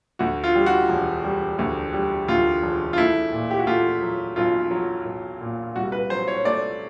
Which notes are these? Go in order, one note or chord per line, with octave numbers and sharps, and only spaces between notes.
D2 F#4
F4
G3
F#4
E1
G3
D2
G3
D2 F4
E1
F4
A3 E4
A#2
G4
F#4
A3 F4
F#3
B1 F4
F#3
B1
A#2
C2 F#4
B4
F#3 C5
C#5
A3 D5